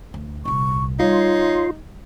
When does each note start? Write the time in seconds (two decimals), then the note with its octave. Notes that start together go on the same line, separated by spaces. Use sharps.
0.14 D2
0.45 D#1 C2 C#6
1.00 G3 D#4 F4 C#5 C6